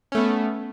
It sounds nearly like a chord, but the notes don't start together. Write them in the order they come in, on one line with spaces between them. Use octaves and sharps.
C#4 A3 B3